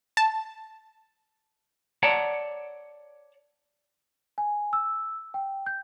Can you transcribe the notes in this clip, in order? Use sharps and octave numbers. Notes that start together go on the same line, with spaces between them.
A5
C#5 D5 F#5 A5 A#5
G#5
E6
G5
G6